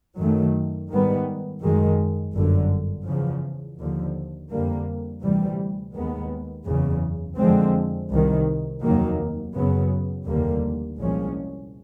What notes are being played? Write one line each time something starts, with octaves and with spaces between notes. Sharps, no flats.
F#2 D#3 F#3 A3
G#2 D#3 G3 B3
F#2 D#3 G#3
G1 F#2 D3
E2 C#3 F3
D#2 D3 F3
F2 D3 G3 A#3
D2 C3 E3 G3
D#2 D#3 G#3 B3
F#1 E2 C#3
F2 D3 F3 G#3 C4
C2 C3 D#3
F1 D#2 D#3 F#3 A#3
F#2 C#3 F#3 B3
F1 D#2 D3 G3 A#3
C2 A#2 F3 G#3 C#4